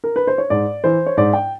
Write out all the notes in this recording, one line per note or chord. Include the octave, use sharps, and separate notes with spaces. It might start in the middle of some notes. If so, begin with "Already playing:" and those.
A#4
B4
C5
C#5
G#2 D5
E3 C5
C#5
G#2 D5
G5